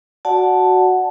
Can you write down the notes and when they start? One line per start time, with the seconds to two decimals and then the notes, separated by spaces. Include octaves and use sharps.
0.25 F#4 D5 F#5 A5